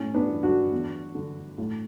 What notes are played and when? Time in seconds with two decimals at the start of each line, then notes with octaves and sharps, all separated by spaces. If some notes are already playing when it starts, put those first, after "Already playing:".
Already playing: A2 C#4
0.14 B3 D4
0.29 E3
0.43 D4 F#4
0.72 E2
1.15 D3
1.58 A2